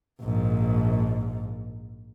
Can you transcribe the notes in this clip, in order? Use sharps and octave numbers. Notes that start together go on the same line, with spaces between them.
A#1 G#2